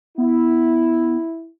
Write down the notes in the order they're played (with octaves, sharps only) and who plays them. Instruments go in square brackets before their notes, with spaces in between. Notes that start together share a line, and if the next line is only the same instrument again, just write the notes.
[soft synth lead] B3 [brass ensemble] E4